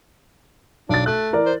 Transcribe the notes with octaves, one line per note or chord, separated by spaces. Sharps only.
B1 D4 A6
A3 F#6
E3 A#4 D5
C5